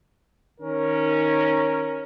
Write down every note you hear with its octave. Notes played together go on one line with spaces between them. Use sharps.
D#3 C#4 A#4